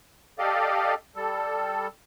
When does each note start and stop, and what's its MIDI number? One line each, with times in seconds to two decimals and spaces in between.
0.39 0.94 67
0.39 0.94 69
0.39 0.94 74
0.39 0.94 75
0.39 0.94 77
1.16 1.87 55
1.16 1.87 69